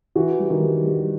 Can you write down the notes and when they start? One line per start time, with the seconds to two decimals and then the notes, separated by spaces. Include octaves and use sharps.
0.15 E3 F#4
0.39 G3
0.50 D#3
0.62 G3
0.86 G3